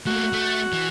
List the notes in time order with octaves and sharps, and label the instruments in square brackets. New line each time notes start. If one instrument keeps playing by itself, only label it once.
[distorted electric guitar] A3 A#3 [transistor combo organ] F#4
[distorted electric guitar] A3
E3